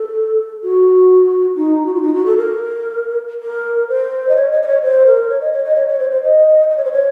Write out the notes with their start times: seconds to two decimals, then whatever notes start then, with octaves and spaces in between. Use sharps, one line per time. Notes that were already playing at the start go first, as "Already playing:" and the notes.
Already playing: A4
0.62 F#4
1.56 D#4
1.86 F#4
1.94 F4
2.03 D#4
2.14 F#4
2.26 A4
2.37 A#4
3.43 A#4
3.89 C5
4.29 D#5
4.36 C#5
4.52 D#5
4.62 D#5
4.67 C#5
4.82 C5
5.06 A#4
5.30 C#5
5.41 D#5
5.52 C#5
5.64 D#5
5.76 C#5
5.88 C#5
5.99 C5
6.11 C5
6.23 D#5
6.70 D#5
6.77 C#5
6.84 C5
6.92 C#5